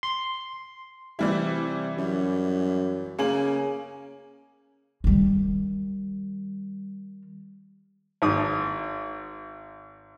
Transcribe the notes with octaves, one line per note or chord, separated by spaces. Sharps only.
C6
C3 E3 G3 E4
F#2
C#3 A#3 G#5 F#7
D#3 G3
G#1 D#6